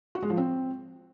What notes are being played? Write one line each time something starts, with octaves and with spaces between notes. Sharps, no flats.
F#4
G#3
F3
C4